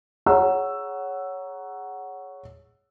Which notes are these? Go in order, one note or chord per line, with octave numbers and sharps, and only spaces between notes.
G#4 C#5 F#5 A#5 E6